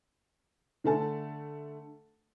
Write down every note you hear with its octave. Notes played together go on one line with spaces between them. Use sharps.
D3 A3 A5